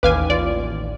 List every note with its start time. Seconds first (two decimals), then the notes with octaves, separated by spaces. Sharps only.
0.03 A1 D#2 B4 F5 G#5 D6
0.30 F4 D5